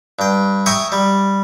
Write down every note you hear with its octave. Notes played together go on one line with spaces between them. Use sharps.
G2 G5
E5 G5 G#5 A#5 C#6 D#6
G3